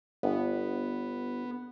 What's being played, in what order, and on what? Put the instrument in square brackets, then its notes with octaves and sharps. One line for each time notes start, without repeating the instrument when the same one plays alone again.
[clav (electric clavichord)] G1 [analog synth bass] B3